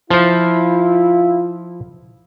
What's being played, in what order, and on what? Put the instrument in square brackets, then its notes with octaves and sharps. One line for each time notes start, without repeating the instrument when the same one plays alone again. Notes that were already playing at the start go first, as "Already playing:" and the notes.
[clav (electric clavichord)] F3 C5 [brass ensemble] E4 F4